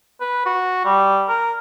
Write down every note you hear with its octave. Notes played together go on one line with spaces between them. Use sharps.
B4
F#4
G3
A#4